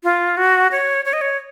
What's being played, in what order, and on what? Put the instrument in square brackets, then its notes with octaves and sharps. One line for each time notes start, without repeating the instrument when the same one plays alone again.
[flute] F4
F#4
C#5
C#5
D#5
C#5